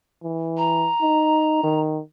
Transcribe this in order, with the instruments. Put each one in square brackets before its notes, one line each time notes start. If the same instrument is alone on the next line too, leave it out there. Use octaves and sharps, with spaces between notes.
[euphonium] E3
[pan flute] A#5
[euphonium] D#4
D#3